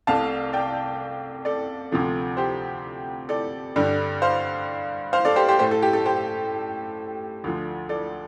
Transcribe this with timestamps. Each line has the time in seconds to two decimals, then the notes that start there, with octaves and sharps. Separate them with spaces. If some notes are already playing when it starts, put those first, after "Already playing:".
0.07 C2 C3 A3 F5 A5
0.53 D5 G5
1.45 A4 D5
1.92 D2 C3 F3 A3
2.37 G4 C5
3.29 A4 D5
3.76 G2 D3 G3
4.22 C5 F5
5.13 C5 F5
5.25 A4 D5
5.36 G4 C5
5.48 G4 C5
5.59 A2 A3 G4 C5
5.71 A4
5.82 G4
5.93 A4
6.05 G4 C5
7.44 D2 D3 F3
7.89 A4 D5